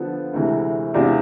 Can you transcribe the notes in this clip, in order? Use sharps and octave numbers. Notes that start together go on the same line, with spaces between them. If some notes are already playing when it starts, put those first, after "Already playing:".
Already playing: D3 F3 B3 F4 A4
D2 C3 E3 G#3
E2 C3 G#3 D4 F4